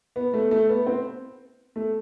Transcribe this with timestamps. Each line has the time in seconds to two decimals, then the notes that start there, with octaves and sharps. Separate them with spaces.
0.16 B3
0.34 A3
0.51 A3
0.69 B3
0.87 C4
1.76 A3